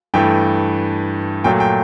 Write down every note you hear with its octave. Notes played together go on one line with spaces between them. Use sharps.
G2 E3 A3 G5
A#2 F#3 A3 G5
G5